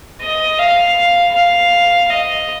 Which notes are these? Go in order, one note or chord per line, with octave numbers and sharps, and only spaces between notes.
D#5
F5
F5
D#5